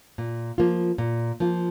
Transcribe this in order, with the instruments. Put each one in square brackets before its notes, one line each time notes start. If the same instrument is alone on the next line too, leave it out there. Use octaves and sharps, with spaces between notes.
[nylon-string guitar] A#2
F3 A#3 F4
A#2
F3 A#3 F4